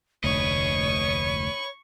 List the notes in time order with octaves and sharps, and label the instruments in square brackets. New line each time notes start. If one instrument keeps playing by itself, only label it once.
[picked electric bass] F1 D2 [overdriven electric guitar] B4 D#5 [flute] C#5 [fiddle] C#6